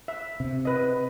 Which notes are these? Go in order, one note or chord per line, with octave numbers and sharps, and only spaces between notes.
E5
C3
B4 D#5